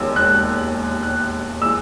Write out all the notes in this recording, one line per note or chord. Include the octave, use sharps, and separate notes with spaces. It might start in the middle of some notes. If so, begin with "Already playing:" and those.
Already playing: E1 D#2 D#3 G#3 E6
F#6
F#6
E3 G#3 E6